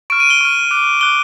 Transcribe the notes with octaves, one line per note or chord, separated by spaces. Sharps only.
C#6 F6 D7
D#7
G7
C#6 F6
D6 F#6
D6 F#6 G7